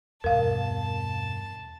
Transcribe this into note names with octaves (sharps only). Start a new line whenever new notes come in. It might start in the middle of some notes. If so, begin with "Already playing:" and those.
E2 G2 B2 A#4 F5 A5